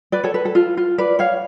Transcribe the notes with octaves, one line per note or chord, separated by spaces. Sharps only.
B4 D5
A4 C#5
B4
A4
F4
F4
B4 D5
C#5 F5